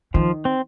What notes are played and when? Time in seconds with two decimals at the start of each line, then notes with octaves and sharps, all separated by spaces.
0.14 D#3 F3
0.45 C4